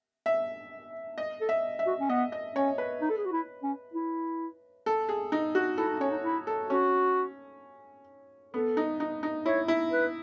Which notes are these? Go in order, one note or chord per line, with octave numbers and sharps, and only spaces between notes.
E5
D#5
A4
E5
E5
F#4
C#4
B3 D#5
D#5
C#4 C#5
B4
D#4
A4
G#4
F#4
E4
C#4
E4
A4
G#4
D#4
F#4
E4 A4
D#4
C#4 C#5
D#4
E4
A4
C#4 F#4
B3 A4
D#4
D#4
D#4
E4 C#5
E4
B4